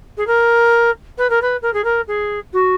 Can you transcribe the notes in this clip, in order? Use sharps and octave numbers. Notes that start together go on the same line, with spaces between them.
G#4
A#4
B4
A#4
B4
A#4
G#4
A#4
G#4
F#4